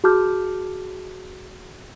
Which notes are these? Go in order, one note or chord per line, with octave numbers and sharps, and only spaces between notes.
F#4 G#4 A5 D6 F6 G6